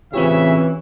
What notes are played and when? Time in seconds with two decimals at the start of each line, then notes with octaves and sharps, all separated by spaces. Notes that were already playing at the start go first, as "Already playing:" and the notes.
0.13 A1 C#3 E3 C4 C#4 F4 G4 E5